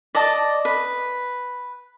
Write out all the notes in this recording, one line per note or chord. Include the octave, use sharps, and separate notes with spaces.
D5 D#5 A5
B4